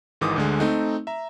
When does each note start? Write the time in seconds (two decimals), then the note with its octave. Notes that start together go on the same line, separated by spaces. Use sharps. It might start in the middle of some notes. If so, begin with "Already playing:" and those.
0.21 G#1 G#2 D#3 E3 D6 D#6
0.36 D2 D3 G#3
0.60 A3 C4 D#4
1.07 E5 A#5